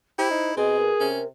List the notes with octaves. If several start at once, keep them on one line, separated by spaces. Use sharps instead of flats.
E4 G4 C5
D#4
B2 C4 G#4 D#5
A#4
C3 C#4